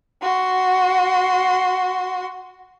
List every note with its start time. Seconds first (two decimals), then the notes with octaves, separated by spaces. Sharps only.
0.22 F#4 C6